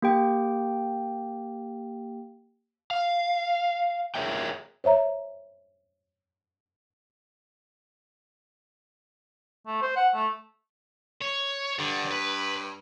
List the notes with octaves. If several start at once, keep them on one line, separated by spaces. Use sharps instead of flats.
A#3 G4 G5
F5
G#4 A#4 B4 C#5 E5 G5
C5 C#5 E5 A#5
A3
C5
F#5
A3
C#5
G2 D3
B4